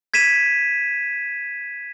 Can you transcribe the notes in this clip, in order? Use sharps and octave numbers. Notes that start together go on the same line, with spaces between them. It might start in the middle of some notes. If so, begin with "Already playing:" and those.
G#6 B6 D#7 E7